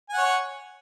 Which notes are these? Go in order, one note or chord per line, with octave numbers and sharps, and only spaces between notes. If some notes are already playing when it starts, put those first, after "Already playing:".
C#5 F#5 G#5